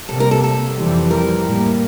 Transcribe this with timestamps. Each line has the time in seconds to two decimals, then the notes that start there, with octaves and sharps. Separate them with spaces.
0.09 C3 G3 A#3 A4
0.20 A#4
0.31 A4
0.44 A4
0.77 F2 E3 G3 C4
1.11 A#4
1.45 A2 G3 A#3